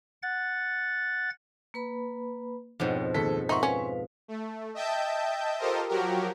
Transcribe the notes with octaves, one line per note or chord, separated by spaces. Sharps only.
F#5 A6
A#3 B4 B5
F2 G#2 B2 C#5 G5
D#2 G#4 A4 B6
D#4 A#4 E5 F#5 C6 C#6
C#4 B4 F5
A3
D#5 E5 G5 A5 G6
F4 G4 A4 A#4 C5 D#5
F3 F#3 F#4 G4 A#4